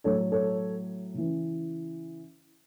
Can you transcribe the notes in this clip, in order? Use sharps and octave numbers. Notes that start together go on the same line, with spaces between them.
A2 F#3 A4 C#5
A4 C#5
C#3 E3